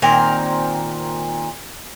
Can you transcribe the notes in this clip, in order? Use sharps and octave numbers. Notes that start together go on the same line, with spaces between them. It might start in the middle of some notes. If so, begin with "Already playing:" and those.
A#2 D#3 C4 A#4